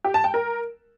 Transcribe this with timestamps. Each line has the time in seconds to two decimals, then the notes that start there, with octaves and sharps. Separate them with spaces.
0.04 G4
0.14 A5
0.24 G5
0.34 A#4